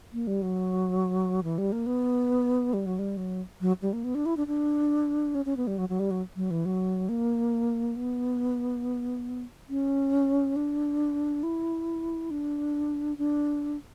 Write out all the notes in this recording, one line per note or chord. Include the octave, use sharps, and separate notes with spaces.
A#3
G3
F#3
E3
G3
A#3
B3
G3
F#3
G3
F#3
F#3
G3
A#3
B3
D4
E4
D4
D4
C#4
C#4
B3
G3
F#3
F#3
G3
F#3
F#3
E3
F#3
A#3
B3
C#4
D4
E4
D4
D4